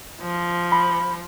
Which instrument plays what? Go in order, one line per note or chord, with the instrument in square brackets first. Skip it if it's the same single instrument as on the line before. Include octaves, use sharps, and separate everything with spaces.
[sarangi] F3
[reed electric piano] B5